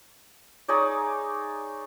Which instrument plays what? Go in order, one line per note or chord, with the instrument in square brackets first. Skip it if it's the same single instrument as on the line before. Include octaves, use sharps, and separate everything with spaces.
[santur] D#4 G#4 C#5 D5